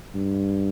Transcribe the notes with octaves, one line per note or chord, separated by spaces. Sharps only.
G2